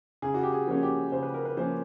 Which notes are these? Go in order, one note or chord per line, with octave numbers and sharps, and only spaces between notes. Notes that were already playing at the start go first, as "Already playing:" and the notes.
C#3 G#4
F#4
G4
G#4
F3 A#3 C#4
G4
C#3 C5
B4
A#4
B4
F3 A#3 C#4 C5